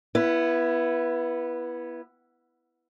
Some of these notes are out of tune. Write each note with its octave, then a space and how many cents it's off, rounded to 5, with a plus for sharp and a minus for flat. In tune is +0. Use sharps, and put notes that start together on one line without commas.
B3 -10 E4 +15